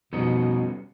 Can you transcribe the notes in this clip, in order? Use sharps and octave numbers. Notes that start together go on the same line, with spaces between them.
F2 B2 G3 B3 C#4 D#4 D#5